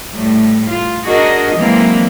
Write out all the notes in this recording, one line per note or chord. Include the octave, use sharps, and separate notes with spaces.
A2 G3 A3
F4
D4 F#4 G#4 A#4 D#5
E3 F#3 G#3 A#3 C4